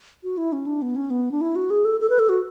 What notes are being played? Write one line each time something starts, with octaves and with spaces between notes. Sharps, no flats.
F#4
E4
C#4
D4
B3
C#4
B3
D4
E4
F#4
G#4
A4
A4
B4
A4
F#4